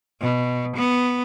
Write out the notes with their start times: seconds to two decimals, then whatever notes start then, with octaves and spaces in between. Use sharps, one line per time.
0.21 B2
0.76 B3